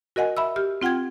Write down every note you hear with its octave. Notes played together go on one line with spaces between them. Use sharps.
F#4 A#4 D#5 F#5 G#5
E5 B5 E6
G4 F6
C4 F4 F#5 G5 G#6